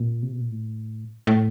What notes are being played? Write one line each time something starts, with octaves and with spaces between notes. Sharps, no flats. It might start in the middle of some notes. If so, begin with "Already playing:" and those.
Already playing: A#2
C3
B2
A#2
A2
A2